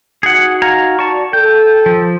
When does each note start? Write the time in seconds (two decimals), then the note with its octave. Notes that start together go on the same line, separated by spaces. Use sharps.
0.23 D#4 F#4 G#4 F#5
0.62 F5 G#5 A#5
0.99 F#4 D5 A5 C#6
1.33 A4 G5
1.86 F3